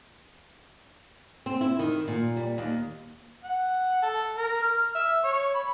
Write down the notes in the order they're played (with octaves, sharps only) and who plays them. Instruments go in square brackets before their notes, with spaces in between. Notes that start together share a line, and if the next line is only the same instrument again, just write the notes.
[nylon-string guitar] C4
E4
D#3
A#2
G3
D#2
[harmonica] F#5
A4
A#4
F6
E5
C#5
B5